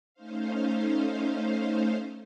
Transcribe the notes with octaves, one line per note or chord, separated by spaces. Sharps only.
A3 C#4 D#4 C5 F5